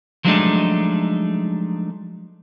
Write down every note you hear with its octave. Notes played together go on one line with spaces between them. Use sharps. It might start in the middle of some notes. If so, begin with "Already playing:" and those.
F3 F#3 G#3 A3 D4 D#4